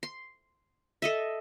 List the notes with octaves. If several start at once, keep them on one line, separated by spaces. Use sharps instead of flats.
C6
A4 D#5 E5